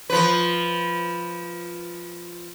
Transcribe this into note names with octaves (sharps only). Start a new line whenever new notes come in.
F3 B4